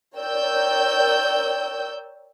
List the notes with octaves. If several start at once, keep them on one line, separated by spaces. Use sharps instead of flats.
A#4 C#5 D5 G5 E6 G6